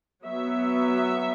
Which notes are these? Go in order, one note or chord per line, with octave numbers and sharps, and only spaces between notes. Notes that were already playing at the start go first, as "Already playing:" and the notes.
F#3 B3 E5